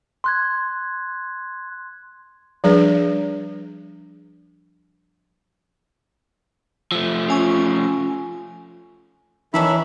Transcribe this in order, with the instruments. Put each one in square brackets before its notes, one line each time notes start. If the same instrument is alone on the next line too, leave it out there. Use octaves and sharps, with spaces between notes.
[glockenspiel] C6 F#6 G#6
[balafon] F3 G3 D4 G#4 B4
[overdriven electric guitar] F3 A3 [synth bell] E6
[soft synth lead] C#4 [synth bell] F4 G#5 C#6
[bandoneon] D#3 E5 B5 [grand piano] E3 [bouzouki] C#4 D4 A#4